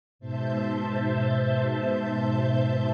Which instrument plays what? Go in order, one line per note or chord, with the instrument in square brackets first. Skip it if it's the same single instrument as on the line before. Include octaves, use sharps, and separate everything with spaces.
[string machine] G#2 B2 C5 E5 A5 G6